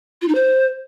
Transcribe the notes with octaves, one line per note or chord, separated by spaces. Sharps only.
F4
D#4
C5